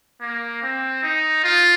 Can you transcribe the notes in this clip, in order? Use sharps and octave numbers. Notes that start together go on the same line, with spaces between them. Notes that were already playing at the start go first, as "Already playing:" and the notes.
A#3
C4
D#4
F4